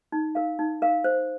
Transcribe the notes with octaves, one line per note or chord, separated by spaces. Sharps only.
D#4
A#4 F5
D#4
A#4 F5
C5